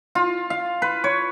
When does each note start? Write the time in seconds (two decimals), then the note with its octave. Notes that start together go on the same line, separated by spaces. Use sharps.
0.15 F4
0.50 F5
0.82 B4
1.04 C#5